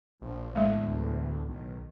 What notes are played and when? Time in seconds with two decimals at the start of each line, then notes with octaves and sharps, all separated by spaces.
0.22 A#1 A#2 F3
0.55 E2 A2 D3 G#3 A3
0.87 D2
1.48 B1 D#3